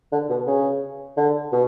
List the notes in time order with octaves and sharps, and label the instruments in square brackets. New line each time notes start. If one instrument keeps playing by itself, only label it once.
[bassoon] D3
B2
C#3
D3
B2